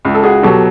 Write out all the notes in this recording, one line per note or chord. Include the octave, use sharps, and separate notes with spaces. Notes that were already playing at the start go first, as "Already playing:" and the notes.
C#2
A4
F#4 G#4
B2 F#3 G4 A4